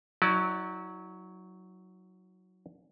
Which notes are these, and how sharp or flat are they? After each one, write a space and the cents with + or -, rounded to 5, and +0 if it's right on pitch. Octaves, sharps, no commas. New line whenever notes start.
F#3 +0 E4 -40 D5 +10